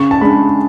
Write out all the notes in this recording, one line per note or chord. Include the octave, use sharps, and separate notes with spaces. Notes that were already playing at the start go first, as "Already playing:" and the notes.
Already playing: C#3 C#6
A5
G#3 D4 B5